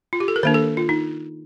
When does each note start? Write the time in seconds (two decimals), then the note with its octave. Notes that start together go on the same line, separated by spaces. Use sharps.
0.13 F4
0.20 G4
0.28 A4
0.36 A#4
0.43 D#3 A#3 D4 C5
0.54 A4
0.77 F4
0.89 D#4